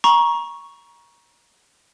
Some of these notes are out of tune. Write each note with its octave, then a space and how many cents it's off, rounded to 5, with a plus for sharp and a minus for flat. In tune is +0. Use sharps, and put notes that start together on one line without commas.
A#5 +25 C#6 +0